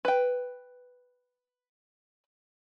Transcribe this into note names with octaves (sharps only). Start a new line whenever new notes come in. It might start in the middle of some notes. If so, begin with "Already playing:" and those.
B4 G5